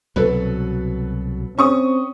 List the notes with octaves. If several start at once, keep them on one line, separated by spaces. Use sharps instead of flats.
C2 B2 F#3 A4 B4
C4 C#4 C#6 D#6